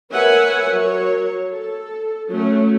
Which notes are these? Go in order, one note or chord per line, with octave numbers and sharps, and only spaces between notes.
A#4 B4 C#5 E5 F#5 G#5
F#3 A#4 C#5
A4
F#3 A3 C#4